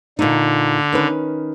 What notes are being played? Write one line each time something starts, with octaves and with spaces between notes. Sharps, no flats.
A#2 D3 D#4
D#3 C#4 B4